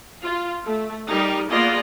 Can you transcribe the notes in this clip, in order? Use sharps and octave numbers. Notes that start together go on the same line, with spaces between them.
F4
A3
G3 D#4 G4 A#4
A#3 B3 F4 G#4 D5 D#5